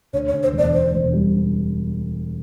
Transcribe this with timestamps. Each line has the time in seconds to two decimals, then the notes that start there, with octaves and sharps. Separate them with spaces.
0.13 D2 C#5
0.28 C#5
0.33 D2
0.43 C5
0.53 E1
0.58 D5
0.73 E1 C5
0.94 E1
1.13 G3